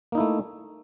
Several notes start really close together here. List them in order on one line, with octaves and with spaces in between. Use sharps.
A#3 D#4 E4 A3